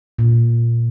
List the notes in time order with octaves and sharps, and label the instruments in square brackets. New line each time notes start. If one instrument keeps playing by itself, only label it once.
[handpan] A#2